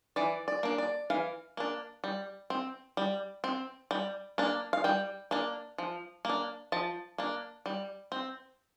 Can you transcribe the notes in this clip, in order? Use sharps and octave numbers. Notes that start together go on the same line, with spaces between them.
E3 D5
D5
A#3 D4
D5
E3 F5
A#3 D4
G3
C4
G3
C4
G3
A#3 D4
F5
G3 G5
A#3 D4
F3
A#3 D4
F3 A5
A#3 D4
G3
C4